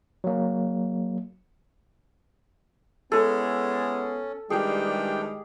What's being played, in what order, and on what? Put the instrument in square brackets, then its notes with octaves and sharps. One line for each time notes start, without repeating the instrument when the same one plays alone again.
[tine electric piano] F#3 A#3
[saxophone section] G#3 E4 G#4 [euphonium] B3 [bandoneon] C#4 [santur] A4
[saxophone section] D#3 E3 G3 [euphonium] G#3 [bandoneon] D4 G5 [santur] G4 G#4